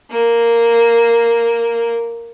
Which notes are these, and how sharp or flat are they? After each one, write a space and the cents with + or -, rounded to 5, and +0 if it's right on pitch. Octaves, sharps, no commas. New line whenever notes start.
A#3 -5